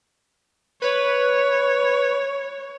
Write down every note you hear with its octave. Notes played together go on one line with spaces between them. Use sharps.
B4 C#5